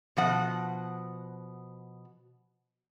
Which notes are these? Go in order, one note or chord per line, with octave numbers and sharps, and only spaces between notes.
B2 F3 F#5